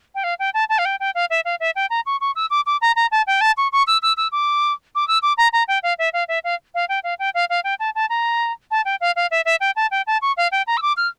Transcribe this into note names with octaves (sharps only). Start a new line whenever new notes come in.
G5
F5
G5
A5
A5
F5
G5
G5
F5
E5
F5
E5
G5
A#5
C#6
C#6
E6
D6
D6
A#5
A#5
A5
G5
A5
C#6
C#6
E6
E6
E6
D6
D6
E6
D6
A#5
A#5
G5
F5
E5
F5
E5
F5
F5
G5
F5
G5
F5
F5
G5
A5
A5
A#5
A5
G5
F5
F5
E5
E5
G5
A5
G5
A5
C#6
F5
G5
A#5
E6
D6
F6